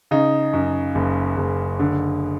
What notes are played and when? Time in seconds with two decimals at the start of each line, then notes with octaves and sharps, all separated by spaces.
0.11 C#3 D#4
0.53 F#2
0.95 F#1
1.37 F#1
1.80 D3